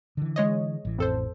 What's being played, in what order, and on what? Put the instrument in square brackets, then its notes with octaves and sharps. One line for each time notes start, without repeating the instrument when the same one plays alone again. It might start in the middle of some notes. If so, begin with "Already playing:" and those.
[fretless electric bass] D3 E3
[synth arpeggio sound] G#3 C#5 D#5
[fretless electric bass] A1 E3
[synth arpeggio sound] F2 A4 C5